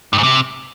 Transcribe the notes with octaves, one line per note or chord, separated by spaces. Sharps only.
G2
G#2
C3